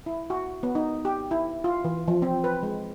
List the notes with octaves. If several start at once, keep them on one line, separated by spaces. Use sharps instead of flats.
E4
F#4
B3
D#4
G4
E4
F4
E3
F3
C4
B4
G#3